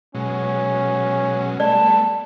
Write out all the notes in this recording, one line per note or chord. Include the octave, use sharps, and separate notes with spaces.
B2 F#3 G#3 C#4
G3 A3 B3 D5 A5